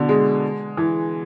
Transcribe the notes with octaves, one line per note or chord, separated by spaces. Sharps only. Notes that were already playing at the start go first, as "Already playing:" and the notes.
Already playing: B2 D3
G#3
E3